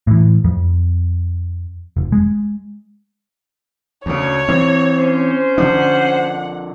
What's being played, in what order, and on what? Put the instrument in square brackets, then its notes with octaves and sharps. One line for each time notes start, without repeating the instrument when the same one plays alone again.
[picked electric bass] A2 E3
F2
F1
G#3
[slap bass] D2 C#3 [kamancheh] C#5
[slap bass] E3 C4
[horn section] C#4 C5
[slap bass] D3 F3 D4 [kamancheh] F#5